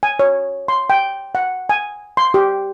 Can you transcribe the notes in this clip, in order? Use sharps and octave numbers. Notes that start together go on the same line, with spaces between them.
G#5
C#5
C6
G5
F#5
G#5
C6
G4